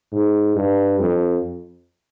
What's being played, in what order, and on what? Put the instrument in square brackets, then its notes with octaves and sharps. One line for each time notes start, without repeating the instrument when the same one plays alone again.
[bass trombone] G#2
G2
F2